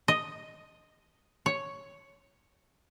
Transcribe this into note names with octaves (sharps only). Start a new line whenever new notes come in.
D#5
C#5